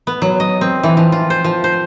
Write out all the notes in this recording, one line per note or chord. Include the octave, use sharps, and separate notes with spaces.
B3
F#3
D#5
C4
E3
F3
F4
C5
F3
C5